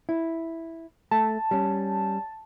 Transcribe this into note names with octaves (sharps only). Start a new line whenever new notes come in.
E4
A3 A5
G3 C#4